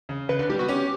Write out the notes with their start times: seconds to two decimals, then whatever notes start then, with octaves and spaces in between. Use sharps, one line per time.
0.09 C#3
0.29 C#3 B4
0.39 D3 B4
0.49 G3 G4
0.59 B3 F#4
0.68 C#4 G4